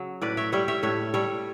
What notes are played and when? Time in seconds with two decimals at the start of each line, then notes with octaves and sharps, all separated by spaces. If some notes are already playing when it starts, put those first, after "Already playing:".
Already playing: C#3 F#3
0.22 A2 B4 D5
0.37 C#5 E5
0.52 G3 C#5 E5
0.68 C#5 E5
0.83 A2 C#5 E5
1.14 G3 A4 C#5